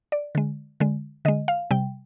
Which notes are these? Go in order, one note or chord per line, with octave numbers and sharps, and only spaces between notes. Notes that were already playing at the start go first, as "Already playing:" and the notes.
D5
D3 G#3
D3 G#3
D3 G#3 D#5
F5
C3 G3 G5